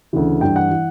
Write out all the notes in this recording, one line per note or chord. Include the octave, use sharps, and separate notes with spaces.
D2 C#3 E3
G2 E3 G5
F#5
E3